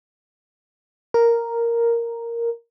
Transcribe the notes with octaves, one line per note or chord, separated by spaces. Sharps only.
A#4